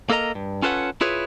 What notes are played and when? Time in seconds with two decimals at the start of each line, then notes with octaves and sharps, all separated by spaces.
0.10 A#3 A4 A#4 D#5 A#5
0.35 G2
0.62 C#4 F4 A4 B4 C#5 F#5
1.01 E4 F4 G#4 B4 C#5